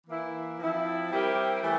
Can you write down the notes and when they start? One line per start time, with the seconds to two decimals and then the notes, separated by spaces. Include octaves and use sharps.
0.07 E3 A#3 E4
0.59 F3 C4 E4
1.11 G3 C4 E4 G4 A#4
1.63 E3 A3 E4